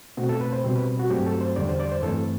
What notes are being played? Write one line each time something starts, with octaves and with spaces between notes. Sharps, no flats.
B2 A3 C4 F#4
A4
B4
C5
B2 G3 C4
B4
F#4
G2 F#3 A3 C4 G4
A4
C5
E2 D3 G3 D5
C5
D5
C5
G2 E3 A3 C4 A4